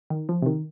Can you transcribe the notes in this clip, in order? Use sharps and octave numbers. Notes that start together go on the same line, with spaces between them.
D#3
F3
C3
D#3